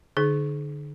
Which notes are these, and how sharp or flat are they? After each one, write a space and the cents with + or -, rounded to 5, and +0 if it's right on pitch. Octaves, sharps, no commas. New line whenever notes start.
D3 +0 D#4 -15 G#4 +35